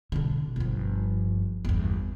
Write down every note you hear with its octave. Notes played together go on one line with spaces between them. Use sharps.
B2 D3
G1 F3
G1 E2